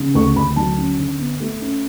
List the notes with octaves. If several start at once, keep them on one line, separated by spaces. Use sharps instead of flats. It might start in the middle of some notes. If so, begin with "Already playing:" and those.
Already playing: C#3
D2 C#6
D2 B5
F#3 A5
C#4
D3
B3
A3
C#4